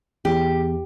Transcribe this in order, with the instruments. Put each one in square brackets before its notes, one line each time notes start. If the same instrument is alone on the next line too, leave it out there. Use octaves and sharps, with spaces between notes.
[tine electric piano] E2 [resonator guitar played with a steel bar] G4